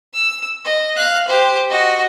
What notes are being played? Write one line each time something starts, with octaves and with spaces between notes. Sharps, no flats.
E6
D#5
F5 F#6
G4 C5
F#4 D#5